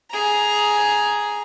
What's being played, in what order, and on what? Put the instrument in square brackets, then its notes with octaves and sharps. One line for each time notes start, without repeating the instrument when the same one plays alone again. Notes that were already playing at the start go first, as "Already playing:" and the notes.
[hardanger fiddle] G#4 A#5